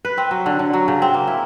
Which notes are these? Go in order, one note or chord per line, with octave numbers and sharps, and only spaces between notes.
B4
C4
F#3
D3
D3
F#3
C#3
C4
A#3
E4